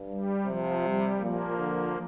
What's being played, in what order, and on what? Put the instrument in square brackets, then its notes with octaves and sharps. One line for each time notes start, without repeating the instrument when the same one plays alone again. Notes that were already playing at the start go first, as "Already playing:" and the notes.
Already playing: [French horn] G2
[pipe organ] G3
[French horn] C3 [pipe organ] F3
[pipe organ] G3
[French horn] A#2 [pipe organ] F3 A#3
[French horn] D3